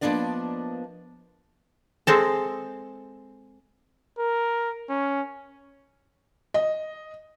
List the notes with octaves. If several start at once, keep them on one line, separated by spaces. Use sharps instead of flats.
F3 A#3 B3 D4 D5 D#5
G#3 C4 A4
A#4
C#4
D#5